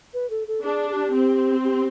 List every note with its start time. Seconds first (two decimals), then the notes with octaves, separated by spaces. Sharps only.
0.14 B4
0.30 A4
0.48 A4
0.64 D4 G#4
0.89 G#4
0.93 G4
1.13 C4
1.64 G4